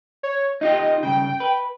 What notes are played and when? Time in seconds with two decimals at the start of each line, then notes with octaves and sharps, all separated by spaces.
0.23 C#5
0.61 D#4 F4 G4 D#5
1.03 G2 C#3 G5
1.40 B4